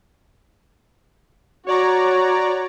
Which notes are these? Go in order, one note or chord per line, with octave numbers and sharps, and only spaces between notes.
F#4 C#5 D5 A#5